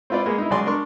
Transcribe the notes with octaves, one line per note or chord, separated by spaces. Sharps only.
C4 E4 F4 B4 D5
G#3 A#3 B3
D#4 E4
C#2 F#3 F#4 G#4 D5 C6
D4 A#4 C6 C#6